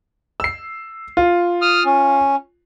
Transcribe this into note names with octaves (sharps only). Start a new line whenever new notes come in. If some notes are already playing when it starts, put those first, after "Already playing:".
E6 C7
F4
D#6 F6
C#4